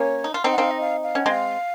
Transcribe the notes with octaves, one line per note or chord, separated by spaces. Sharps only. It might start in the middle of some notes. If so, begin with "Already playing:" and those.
Already playing: A#3 C#4 C#5
D#4
F4
C4 D#4
F#5
C4 D#4 F5
D#5
F5
F5
C#4 F#5
G#3 C4 F5